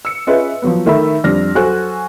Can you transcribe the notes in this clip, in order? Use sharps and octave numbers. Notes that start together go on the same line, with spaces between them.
E6 C#7
C#4 F4 G#4 B4 D#5 E5
F3 F#3 B3
D#3 A3 E5 B5 E6
F2 G3 D4 F6 A#6
F#3 F#4 A4 C5 G#5 F#6